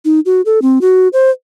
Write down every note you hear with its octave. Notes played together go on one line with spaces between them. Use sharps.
D#4
F#4
A4
C4
F#4
C5